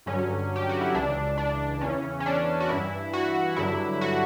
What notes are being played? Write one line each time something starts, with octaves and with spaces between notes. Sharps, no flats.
G2 D3 F#3 C#4
G4
F#4
E4
C#2 C#3 E3 D4
D4
E2 C#3 E3 C#4
C#4
D4
F#4
G2 E3 E4
F#4
G2 D3 F#3 E4
F#4